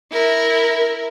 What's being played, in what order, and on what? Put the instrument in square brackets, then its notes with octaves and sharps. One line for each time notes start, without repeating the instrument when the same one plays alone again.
[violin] E4 A#4